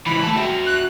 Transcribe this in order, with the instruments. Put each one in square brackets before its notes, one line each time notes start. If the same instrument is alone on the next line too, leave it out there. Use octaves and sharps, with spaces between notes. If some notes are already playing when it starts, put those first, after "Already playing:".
[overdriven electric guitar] C#2 E3 [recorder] B5
[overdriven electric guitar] A3 A4
[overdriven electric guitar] F#4 E5 [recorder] G5
[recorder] F#6